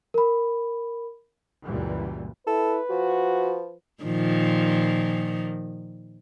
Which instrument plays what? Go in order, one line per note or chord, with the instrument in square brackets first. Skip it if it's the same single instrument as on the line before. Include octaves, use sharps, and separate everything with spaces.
[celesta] A#4 B5
[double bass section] C#2 F#2 A#2 E3 G3
[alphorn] E4 [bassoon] A4 [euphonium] B4
[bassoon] F3 [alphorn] F#4
[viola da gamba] A#2 D#3 F3